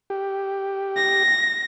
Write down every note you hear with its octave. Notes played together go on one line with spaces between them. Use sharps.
G4
A#6